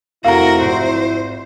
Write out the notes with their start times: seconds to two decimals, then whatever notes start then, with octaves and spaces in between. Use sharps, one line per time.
0.25 F1 F3 E4 F#4 A#4 F5 A#5
0.61 G#1 C5